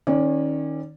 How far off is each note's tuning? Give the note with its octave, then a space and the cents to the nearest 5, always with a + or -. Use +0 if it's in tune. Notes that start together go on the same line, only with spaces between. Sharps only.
D#3 +0 C#4 -25 D5 +0